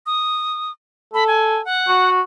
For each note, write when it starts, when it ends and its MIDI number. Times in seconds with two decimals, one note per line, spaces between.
0.06 0.71 87
1.14 1.60 69
1.14 1.24 83
1.27 1.64 80
1.65 2.10 78
1.88 2.21 66